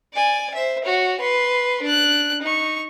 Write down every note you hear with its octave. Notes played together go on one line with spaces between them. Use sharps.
D5 G#5
C5 E5
F#4 C#5
B4 C6
D4 F#6
D#4 C#6